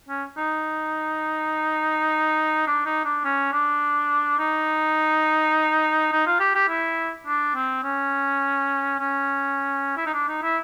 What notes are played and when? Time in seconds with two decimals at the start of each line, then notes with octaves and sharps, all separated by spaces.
0.09 C#4
0.37 D#4
2.67 D4
2.86 D#4
3.05 D4
3.25 C#4
3.52 D4
4.39 D#4
6.12 D#4
6.26 F4
6.40 G4
6.55 G4
6.69 E4
7.27 D4
7.55 C4
7.84 C#4
9.00 C#4
9.97 E4
10.06 D#4
10.14 D4
10.28 D#4
10.42 E4